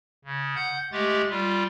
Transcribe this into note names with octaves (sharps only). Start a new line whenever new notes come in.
C#3
F#5 G6
G#3 A3 G4 A6
G3 F4